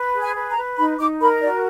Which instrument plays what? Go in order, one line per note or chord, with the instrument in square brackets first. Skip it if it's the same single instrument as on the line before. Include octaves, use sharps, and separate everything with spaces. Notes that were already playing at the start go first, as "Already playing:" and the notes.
Already playing: [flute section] B4
G#4
G#5
B4
A#5
B4
D#4 B5
D#4 D6
A#4 B5
F#4 D5